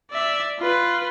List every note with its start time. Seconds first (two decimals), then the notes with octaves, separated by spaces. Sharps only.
0.11 D5 E5
0.59 F4 B4